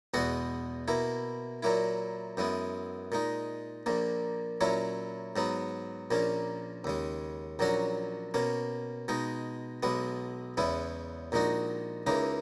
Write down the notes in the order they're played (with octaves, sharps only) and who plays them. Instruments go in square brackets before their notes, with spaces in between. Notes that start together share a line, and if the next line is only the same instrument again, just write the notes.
[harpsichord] E2 B2 G#3 B3 F#4
B2 A#3 E4
A#2 F#3 A#3 E4
F#2 E3 G#3 B3
A#2 G#3 D#4
A#1 A#2 A#3
A#2 F#3 C#4 E4
G#2 F#3 B3
A#1 A#2 A#3 C#4
D#2 C#3 G#3
A#1 A#2 F#3 C#4 F#4
B2 A#3 C#4
B2 G#3 D#4
B1 B2 G#3 B3
E2 C#3 G#3 B3 E4
A#1 A#2 G#3 D#4 F#4
C#2 C#3 E3 A#3 D#4